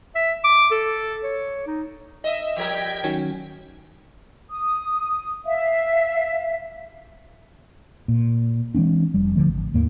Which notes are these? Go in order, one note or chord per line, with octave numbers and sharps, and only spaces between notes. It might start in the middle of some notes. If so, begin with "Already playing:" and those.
E5
D6
A4
C#5
D#4
D#5 E5
F3 G3 A#4 G5 G#6 B6
D#3 F#3 C#4
D#6
E5 F5
A#2
E3 G#3 C4 D4
F1 G3
D1 D3 F3 A3
G#1
D#2 G#2 A#3